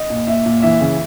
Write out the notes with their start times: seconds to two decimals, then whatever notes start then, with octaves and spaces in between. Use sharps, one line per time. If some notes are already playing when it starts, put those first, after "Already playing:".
Already playing: D#5
0.10 A#2
0.27 A#2 E5
0.45 A#2
0.62 E3 E5
0.81 C#3